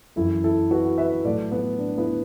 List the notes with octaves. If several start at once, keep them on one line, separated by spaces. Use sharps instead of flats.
F#2 E3 E4 A4
E4 A4
F#4 B4
B4 E5
A2 F#3 A4 D5
B3
D4
B3 E4